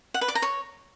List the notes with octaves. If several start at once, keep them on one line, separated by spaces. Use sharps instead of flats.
F#5
B4
D5
A#5
C#5